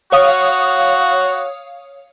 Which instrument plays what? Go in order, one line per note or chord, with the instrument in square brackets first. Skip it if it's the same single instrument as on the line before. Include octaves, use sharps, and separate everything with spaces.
[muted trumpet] F#4 [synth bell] C#5 F5 D#6